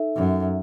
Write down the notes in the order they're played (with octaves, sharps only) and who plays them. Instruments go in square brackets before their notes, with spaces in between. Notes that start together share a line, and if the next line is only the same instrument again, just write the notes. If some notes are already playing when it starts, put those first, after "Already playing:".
Already playing: [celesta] D#4 A4 E5
[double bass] F#2